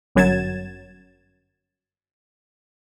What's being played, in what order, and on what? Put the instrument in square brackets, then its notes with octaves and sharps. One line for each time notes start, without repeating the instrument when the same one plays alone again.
[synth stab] G1 F#2 F#3 G#6 A6 E7